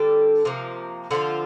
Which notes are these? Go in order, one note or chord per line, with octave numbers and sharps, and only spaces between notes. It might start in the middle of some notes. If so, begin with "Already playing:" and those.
Already playing: D3 G3 D4 A4
C3 F3 A#3
D3 F3 C4 F4